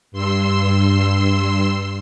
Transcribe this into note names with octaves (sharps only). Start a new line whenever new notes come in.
G2 C6 E6